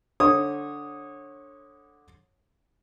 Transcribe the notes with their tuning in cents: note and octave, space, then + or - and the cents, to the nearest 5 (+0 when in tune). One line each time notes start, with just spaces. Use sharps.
D3 +0 C#5 -25 D#6 +0